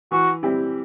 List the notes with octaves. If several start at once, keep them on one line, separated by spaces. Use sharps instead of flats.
E3 F#4
G3 C4 E4 G4